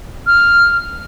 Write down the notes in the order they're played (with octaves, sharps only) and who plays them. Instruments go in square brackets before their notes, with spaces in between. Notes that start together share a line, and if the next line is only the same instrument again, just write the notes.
[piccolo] F6